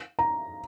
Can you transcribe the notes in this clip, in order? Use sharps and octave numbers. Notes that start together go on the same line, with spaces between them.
A#5